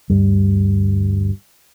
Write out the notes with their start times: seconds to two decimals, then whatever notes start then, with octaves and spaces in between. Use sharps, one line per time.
0.10 D2 G2 G3